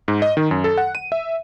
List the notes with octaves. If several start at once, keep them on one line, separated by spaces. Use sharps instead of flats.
G#2
D#5
D#3
F#2
A4
F#5
D#7
E5